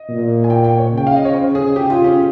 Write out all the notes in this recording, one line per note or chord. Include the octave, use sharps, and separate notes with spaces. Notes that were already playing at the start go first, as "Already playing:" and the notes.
Already playing: D#5
A#2
G#5
G5
G5
C#5
C#3
G5
F5
D#5
C#5
C5
G#4
G4
F4
C#4